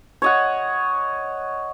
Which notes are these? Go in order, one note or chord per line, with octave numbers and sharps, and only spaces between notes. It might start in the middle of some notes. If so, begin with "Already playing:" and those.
C#5 D#5 F#5